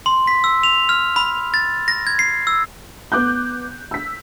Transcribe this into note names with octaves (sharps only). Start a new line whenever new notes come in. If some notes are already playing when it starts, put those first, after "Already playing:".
C6
B6
E6
F7
F6
B5
A6
A#6
G#6
C7
E6
B3 D6 F#6 G6
E6 B6